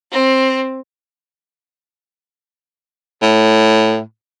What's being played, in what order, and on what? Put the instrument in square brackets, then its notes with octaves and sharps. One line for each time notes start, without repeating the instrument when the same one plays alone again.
[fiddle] C4
[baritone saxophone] A2